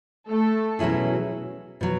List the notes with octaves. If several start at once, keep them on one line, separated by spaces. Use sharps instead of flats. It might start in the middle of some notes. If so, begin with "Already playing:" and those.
A3 A4
B2 F#3 C#4 E4 G#4
B2 F#3